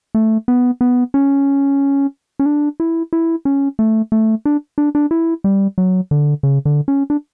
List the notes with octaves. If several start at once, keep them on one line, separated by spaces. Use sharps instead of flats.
A3
B3
B3
C#4
C#4
D4
E4
E4
C#4
A3
A3
D4
D4
D4
E4
G3
F#3
D3
C#3
D3
C#4
D4